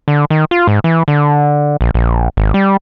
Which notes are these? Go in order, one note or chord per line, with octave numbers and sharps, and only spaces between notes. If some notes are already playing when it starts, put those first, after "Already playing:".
D3
D#3
F4
G#2
E3
D3
A#1
A#1
G#1
G3